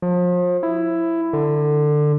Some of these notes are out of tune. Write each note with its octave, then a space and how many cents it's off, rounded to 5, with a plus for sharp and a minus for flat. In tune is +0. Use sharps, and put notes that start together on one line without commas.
F3 +35
E4 +10
D3 +20